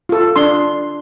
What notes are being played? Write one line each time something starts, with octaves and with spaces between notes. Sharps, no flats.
F4 A4
D4 C6